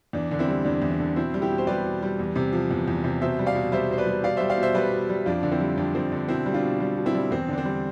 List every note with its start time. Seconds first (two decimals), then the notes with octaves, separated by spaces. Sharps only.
0.13 E2 D4
0.31 D3
0.39 C4 E4
0.48 G3
0.65 E2 D4
0.82 E2
0.91 D4
1.00 D3
1.16 B2 C4 E4
1.34 G3
1.42 E4 G4
1.51 B2
1.58 C5
1.67 G3 B4 D5
1.85 B2
2.02 G3
2.19 E2
2.36 C3
2.53 F3
2.71 E2
2.88 E2
3.04 C3
3.21 B2 C5 E5
3.39 G3
3.46 D5 F5
3.55 B2
3.72 G3 C5 E5
3.90 B2 C5
3.98 B4 D5
4.07 G3
4.24 B2 D5 F5
4.37 G3 C5 E5
4.50 D5 F5
4.58 B2
4.63 C5 E5
4.75 G3 B4 D5
4.92 B2
5.10 G3
5.26 F2 D4 F4
5.43 D3
5.51 C4 E4
5.60 G3
5.77 F2 D4
5.95 F2 C4
6.12 D3 D4
6.28 B2 C4 E4
6.46 G3
6.54 D4 F4
6.63 B2
6.80 G3
6.97 B2
7.06 C4 E4
7.15 G3
7.31 E2 C4
7.48 D3 D4
7.58 C4
7.65 G3